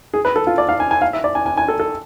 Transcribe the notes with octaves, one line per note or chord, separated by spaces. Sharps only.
G#4
B4
A4
F4
D5
F5
G#5
G#5
F5
E5
D5
G#5
G#5
G#5
A4
A4